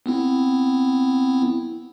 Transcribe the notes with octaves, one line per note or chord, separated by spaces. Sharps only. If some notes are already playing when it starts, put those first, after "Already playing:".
B3 C4 E4